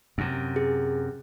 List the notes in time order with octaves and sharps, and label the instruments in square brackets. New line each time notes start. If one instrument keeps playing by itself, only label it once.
[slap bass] F#2 C3
[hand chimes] G#4